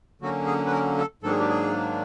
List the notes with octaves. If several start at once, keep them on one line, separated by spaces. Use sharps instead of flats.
D3 F#3 A#3 C#4 F#4
G#4
B4
A#4
A4
G#2 D#3 F#3 A#3 D4 A4
G#4
G4
G#4